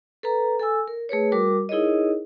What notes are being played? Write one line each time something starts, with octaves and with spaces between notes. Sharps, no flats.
A4 B4 A#5
A4 G#5 E6
A#4
A3 G#4 B4 C#5
G3 F#4 A#4 D6
D#4 E4 G#4 A#4 C#5 D#5